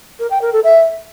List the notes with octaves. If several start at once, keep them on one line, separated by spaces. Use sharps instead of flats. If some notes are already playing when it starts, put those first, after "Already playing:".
A#4
G5
A#4
A4
E5